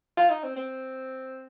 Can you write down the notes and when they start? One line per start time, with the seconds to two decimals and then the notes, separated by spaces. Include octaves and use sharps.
0.17 F4
0.30 D#4
0.44 C4
0.56 C4